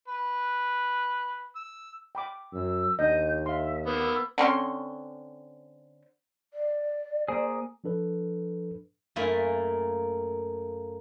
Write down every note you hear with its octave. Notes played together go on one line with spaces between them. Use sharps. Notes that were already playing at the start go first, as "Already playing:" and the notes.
B4
E6
G5 B5 D6
F#2 E6
D#2 D4 D#5 G6
E5 F5 C6
A#3 B3 E6
D3 C4 C#4 C6
D5
A#3 G#4 C5
F3 D4 A4 B4
F#2 A3 A#3 F4 G#5 B5